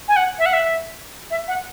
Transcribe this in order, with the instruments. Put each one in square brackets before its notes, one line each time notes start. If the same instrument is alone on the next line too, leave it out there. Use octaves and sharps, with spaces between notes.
[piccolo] G#5
F#5
E5
F#5
E5
E5
F#5